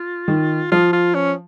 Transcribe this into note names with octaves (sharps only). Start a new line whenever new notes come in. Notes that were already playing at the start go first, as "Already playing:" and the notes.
Already playing: F4
D#3
F3 F4
F4
C#4